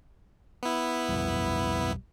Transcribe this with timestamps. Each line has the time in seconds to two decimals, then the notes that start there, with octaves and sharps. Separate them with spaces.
0.63 B3 E4
1.09 B1 F2 G3